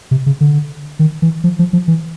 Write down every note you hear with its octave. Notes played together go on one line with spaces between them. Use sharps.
C3
C#3
D3
D#3
E3
F3
F3
F3
E3